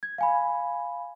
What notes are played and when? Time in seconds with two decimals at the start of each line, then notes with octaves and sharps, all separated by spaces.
0.03 G#6
0.18 F5 G#5 B5